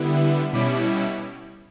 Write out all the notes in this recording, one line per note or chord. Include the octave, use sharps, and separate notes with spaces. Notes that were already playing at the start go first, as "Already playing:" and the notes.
Already playing: D3 G3 B3 E4
B2 G3 C#4 E4 B5 D6